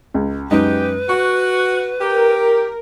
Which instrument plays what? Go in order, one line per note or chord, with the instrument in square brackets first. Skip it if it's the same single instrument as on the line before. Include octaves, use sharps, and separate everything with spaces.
[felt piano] C#2
[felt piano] F#2 G#3 D#4 [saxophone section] G4 [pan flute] B4
[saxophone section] F#4 [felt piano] C#6
[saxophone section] G4 [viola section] A#4